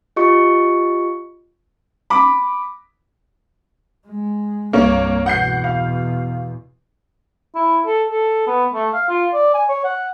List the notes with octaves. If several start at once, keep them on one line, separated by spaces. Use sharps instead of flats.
F4 G4 D#5 C#6 C#7
B5 D6
G#3
C2 G2 A#3 C#5
E2 B2 F#5 G6 C7
F5
E4
A4
A4
B3
A3
F5
F4
D5
G#5
C#5
F#5